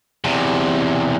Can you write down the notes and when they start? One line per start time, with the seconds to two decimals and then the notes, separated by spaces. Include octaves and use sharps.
0.24 E2 C3